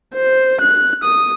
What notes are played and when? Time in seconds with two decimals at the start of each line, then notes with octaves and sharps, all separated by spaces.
0.14 C5
0.60 F#6
1.03 D#6